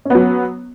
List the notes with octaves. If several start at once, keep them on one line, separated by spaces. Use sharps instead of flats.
F#3 B3 C#4